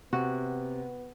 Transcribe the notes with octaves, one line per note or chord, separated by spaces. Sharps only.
C3 B3 F#4